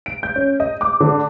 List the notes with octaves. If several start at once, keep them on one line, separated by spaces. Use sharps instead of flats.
D7
G6
C#4
D#5
D6
D3